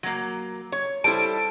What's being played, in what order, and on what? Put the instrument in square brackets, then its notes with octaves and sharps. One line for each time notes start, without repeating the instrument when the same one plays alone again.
[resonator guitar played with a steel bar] F#3 A#3
C#5
[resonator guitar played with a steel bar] G3 E4 [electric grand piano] A4 C5 A5 [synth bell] D7